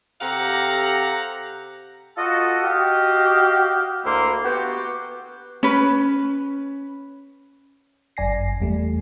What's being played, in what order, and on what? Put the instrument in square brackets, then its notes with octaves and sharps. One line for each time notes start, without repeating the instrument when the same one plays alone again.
[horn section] C3 G4 A4 F5 F#5 A#5
[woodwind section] F4 F#4 A4 D#5
F#4 G4 D#5 F5
D2 A#3 E4 C6
B3 F#4 G4
[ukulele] C#4 B4
[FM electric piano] G1 F#2 D5 G#5 A#6 C7
E2 G3 A3